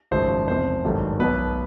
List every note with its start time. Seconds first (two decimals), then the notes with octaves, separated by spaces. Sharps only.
0.11 G#1 F#2 C#3 F3 C5
0.48 E2 C3 F3 C5
0.84 G#1 G2 D#3 F#3 A3
1.20 B1 B2 F#3 B3 B4